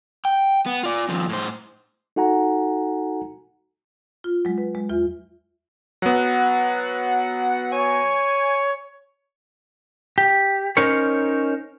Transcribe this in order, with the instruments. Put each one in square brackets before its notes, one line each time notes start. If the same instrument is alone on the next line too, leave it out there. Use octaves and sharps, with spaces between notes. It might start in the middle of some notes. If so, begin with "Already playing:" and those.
[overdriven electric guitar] G5
B3
F4 D5
D#2 F3
A2 C5
[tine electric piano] D#4 F#4 A4 F#5 G#5 A#5
[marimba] F4
F#3 G#3
B4
G#3
E2 F4 E5
[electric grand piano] F#3 B3 [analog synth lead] F#5
[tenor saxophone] C#5 [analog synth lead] G#5
[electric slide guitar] G4
C#4 D#4 A#4 C5 C#5